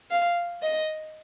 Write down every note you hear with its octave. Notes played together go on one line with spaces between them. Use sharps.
F5
D#5